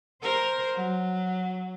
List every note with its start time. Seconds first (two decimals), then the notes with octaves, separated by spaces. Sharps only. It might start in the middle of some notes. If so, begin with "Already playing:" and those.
0.22 A#4 C5
0.75 F#3